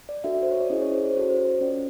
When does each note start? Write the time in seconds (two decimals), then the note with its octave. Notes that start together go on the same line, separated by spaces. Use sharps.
0.09 D5
0.24 D4 F#4 A4 E5
0.42 C5
0.52 C#5
0.61 D5
0.70 C#4 E4 G#4 D#5
0.82 C#5
0.92 C5
1.04 C#5
1.11 C5
1.15 C#4 F#4 A4 C#5
1.30 C5
1.45 C#5
1.61 C#4 F4 A4 D5